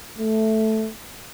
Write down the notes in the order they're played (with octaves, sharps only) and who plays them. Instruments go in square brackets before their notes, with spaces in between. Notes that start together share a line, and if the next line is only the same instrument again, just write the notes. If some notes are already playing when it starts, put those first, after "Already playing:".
[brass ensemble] A3